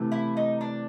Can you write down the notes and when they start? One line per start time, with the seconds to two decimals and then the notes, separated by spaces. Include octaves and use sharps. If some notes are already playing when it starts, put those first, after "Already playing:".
Already playing: C3 E3 A3
0.12 E4
0.37 D#4
0.61 D4